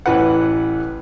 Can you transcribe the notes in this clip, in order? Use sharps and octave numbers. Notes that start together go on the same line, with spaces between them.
A1 E3 B4 F#5